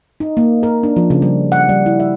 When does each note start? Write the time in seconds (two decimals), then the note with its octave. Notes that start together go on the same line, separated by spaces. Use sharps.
0.20 D#4
0.37 A#3
0.63 A#4
0.83 D4
0.97 F3
1.10 C#3
1.22 G3
1.52 F#5
1.69 G3
1.86 E4
2.00 E5